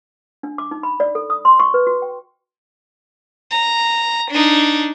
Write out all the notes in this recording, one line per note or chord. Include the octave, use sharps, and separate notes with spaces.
D4
D6
D#4
B5
D5
A4
D#6
C6
C#6
B4
F#4
G5
A#5
D4 D#4